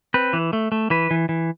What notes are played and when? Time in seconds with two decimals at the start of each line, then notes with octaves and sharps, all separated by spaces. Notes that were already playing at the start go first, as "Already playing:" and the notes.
0.14 C4 B4
0.33 E3
0.53 A3
0.72 A3
0.90 E3 B4
1.11 E3
1.29 E3